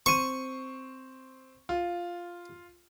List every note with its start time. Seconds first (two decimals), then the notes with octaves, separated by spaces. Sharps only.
0.06 C4 C6 C#6 D#7
1.69 F4